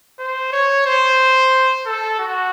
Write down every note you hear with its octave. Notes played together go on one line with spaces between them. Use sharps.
C5
C#5
C5
A4
F#4